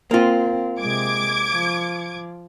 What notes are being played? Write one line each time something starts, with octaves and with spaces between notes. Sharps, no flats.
A#3 C4 F4
C3 G#3 D6 G#6 D7
F3